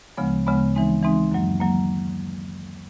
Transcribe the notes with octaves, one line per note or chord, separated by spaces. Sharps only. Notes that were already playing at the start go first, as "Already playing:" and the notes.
D2 C#3 F3 G#3 B3
D2 C#3 F3 G#3 B3
E3 G#3 C4 D#4
E3 G#3 C4 D#4
F#2 D#3 F#3 A#3
D#3 F#3 A#3